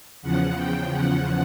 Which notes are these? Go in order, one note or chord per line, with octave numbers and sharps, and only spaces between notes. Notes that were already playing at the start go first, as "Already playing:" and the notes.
E2 C#3 F3 F#5
G5
F#5